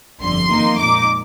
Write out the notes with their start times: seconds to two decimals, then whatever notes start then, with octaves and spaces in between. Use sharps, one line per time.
0.21 G1 F2 D3 C6
0.49 F2 D#3 A#3 D#4
0.76 A#2 G#3 D#4 D6